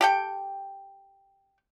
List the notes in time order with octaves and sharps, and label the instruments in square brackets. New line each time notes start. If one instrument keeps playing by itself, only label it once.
[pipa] G4 A4 G5